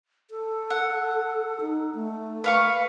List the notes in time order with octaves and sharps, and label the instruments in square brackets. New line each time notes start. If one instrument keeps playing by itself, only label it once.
[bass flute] A4
[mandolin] F#5
[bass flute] D#4
A3
[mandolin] B4 F5 C#6